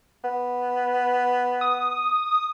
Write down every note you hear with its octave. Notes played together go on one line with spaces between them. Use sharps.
B3
D#6